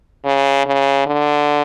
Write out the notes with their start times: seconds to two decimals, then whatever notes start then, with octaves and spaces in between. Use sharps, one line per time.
0.25 C#3
0.66 C#3
1.07 D3